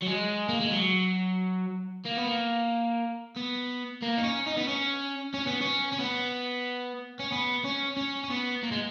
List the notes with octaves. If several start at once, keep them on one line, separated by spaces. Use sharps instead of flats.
F#3
G#3
A#3
G#3
F#3
A#3
B3
A#3
B3
A#3
D#4
C#4
D#4
B3
C#4
C#4
B3
C#4
C#4
B3
C#4
B3
C#4
C#4
C#4
B3
A#3
G#3